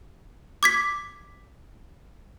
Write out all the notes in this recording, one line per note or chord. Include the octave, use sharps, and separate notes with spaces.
D6 G#6 B6